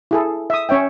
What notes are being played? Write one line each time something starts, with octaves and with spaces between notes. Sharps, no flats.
E4 G#4 A4
E5 D#6
C#4 C#5 E5 G5